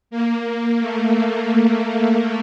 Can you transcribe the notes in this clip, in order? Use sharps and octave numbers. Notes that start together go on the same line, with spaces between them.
A#3
A3
A#3